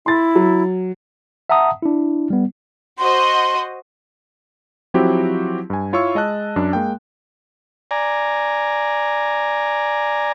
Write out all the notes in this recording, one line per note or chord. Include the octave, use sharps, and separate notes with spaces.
E4 C6 A6
F#3
E5 F#5 A5 A#5 D#6
D4 E4
G3 B3
F#4 C5 D#5 C6
F3 F#3 C4 E4 F#4 G4
G2 G#5
E4 F4 C#5 F5 C#6 E6
G#3 D#5 A5 F#6
F#2 D4
G#3 A#3 G5
D5 G#5 A#5